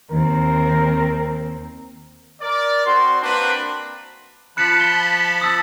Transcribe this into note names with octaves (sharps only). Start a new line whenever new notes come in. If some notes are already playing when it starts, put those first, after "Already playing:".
D#2 C4 A#4
A#4 D5
C4 F#4 C6
A#3 C4 D4 F#4 B4
F3 A5 B5 F#6 C#7
G7
D#6 E6 A6